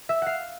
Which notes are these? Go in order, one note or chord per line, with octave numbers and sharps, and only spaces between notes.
E5
F5 F#5